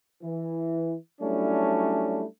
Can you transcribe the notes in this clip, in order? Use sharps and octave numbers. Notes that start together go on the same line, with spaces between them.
E3
F#3 G3 A3 C#4 D4 E4